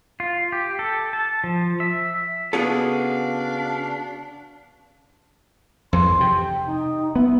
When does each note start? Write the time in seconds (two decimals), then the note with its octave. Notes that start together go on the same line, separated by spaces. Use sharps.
0.20 F4
0.52 G4
0.79 A4
1.13 A5
1.44 F3
1.80 E5
2.53 C#3 B3 D4 F#4 G#4 A4 F5
5.93 F2 E3 C6
6.20 C3 G5
6.66 D#4
7.16 B3 E5